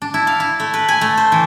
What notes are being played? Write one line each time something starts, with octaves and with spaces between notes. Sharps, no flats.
D4
E4
F5
E4
A3
B4
G#5
A3
C5
E3